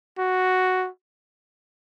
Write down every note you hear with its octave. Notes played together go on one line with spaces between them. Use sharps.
F#4